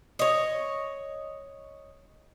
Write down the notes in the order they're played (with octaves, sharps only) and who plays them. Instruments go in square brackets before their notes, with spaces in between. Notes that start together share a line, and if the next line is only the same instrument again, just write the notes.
[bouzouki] C#5 D#5